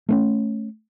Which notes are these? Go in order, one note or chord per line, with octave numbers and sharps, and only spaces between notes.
A3 B3 C#4